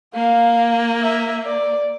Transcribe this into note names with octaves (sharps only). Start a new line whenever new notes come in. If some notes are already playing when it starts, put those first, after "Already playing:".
A#3 F5
E5
D5